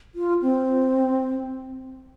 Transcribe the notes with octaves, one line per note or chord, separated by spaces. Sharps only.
F4
C4